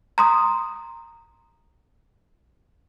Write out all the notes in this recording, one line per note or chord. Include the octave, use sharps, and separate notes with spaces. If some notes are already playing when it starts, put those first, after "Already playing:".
A#5 C6 D#6